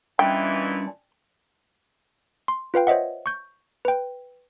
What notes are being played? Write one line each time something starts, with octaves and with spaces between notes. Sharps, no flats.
D#2 A#2 E3 G3 C#4 D4 G5
C6
F4 B4 F5 G5
C5 C#5 D#5 E5 F#5
C#6 G6
B4 G5